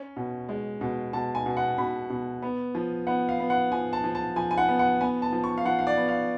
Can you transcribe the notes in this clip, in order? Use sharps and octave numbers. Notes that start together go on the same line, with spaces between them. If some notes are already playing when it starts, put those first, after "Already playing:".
Already playing: C#4
B2
G#3
B2
B2 A5
G#5
B2
F#5
B2 B5
B2
B3
F3
B3 F#5
F5
B3
F#5
F3 G#5
A5
F3
A5
F3 G#5
G#5
F#5
B3
F#5
B3 G#5
A5
F3
C#6
F5
F3 F#5
F5
D5
B3
F5